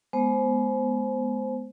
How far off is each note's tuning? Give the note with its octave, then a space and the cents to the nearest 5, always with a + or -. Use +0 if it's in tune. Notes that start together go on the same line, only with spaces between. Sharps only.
G#3 +30 B3 +0 C5 +0